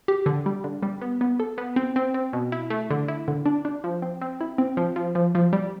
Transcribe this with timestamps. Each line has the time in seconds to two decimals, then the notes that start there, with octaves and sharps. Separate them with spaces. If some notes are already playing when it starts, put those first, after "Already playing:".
0.08 G4
0.26 D3
0.46 G3
0.64 D3
0.83 G3
1.02 B3
1.21 B3
1.40 A4
1.58 B3
1.76 C4
1.96 C4
2.14 C4
2.33 B2
2.52 E4
2.70 A3
2.90 D3
3.08 E4
3.28 D3
3.46 D4
3.65 D4
3.84 F3
4.02 C4
4.21 C4
4.41 E4
4.58 C4
4.77 F3
4.96 F3
5.15 F3
5.35 F3
5.53 G3